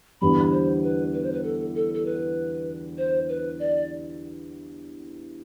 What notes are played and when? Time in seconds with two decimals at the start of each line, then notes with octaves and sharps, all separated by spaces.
0.21 E2 D3 G3 B3 B5
0.52 C5
0.83 B4
1.13 B4
1.23 C5
1.33 B4
1.44 A4
1.75 A4
1.94 A4
2.06 B4
2.98 C5
3.29 B4
3.59 D5